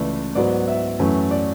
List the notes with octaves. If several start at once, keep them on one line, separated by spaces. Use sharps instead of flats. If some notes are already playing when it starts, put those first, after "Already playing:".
Already playing: C#2 C#3 E3 A3 D5
G#2 F#3 B3 D5
E5
F#2 E3 A3 C#4
D5